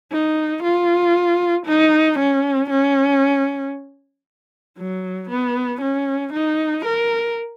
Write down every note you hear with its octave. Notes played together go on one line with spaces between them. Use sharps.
D#4
F4
D#4
C#4
C#4
F#3
B3
C#4
D#4
A#4